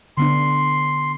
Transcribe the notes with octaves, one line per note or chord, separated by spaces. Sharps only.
D3 B3 D4 C6